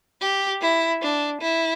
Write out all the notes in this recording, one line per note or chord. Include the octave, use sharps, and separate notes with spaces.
G4
E4
D4
E4